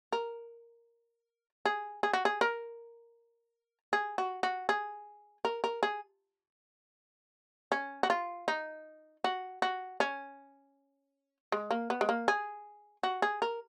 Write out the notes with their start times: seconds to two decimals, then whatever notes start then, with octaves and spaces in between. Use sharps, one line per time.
0.12 A#4
1.65 G#4
2.03 G#4
2.13 F#4
2.25 G#4
2.41 A#4
3.93 G#4
4.18 F#4
4.43 F#4
4.69 G#4
5.45 A#4
5.64 A#4
5.83 G#4
7.72 C#4
8.03 F#4
8.10 F4
8.48 D#4
9.24 F#4
9.62 F#4
10.00 C#4
11.52 G#3
11.71 A#3
11.90 B3
12.01 G#3
12.09 A#3
12.28 G#4
13.03 F#4
13.22 G#4
13.42 A#4